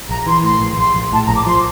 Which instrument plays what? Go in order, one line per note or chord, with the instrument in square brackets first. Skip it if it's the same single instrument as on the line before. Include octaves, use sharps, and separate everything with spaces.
[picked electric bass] A#1 [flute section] A#5
[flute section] A#5
[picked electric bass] E3 [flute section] C6
[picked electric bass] A2 [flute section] C6
[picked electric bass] A#1
[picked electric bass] A#1 [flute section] C6
[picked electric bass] A#1
[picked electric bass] A2 [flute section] A5
[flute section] A#5
[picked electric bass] A#1
[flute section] D6
[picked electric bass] F3 [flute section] C6